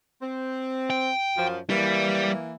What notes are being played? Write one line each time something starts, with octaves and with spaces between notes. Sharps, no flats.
C4
G5
F#2 F3
E3 G3 A#3